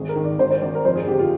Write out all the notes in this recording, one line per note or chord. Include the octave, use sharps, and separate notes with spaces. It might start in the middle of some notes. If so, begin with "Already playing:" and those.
Already playing: G#1 G#4
A#4
D#3
D5
G#1 C5
C5
G#1 D5
A#4
F2 C5
G#4
G1 G4
F4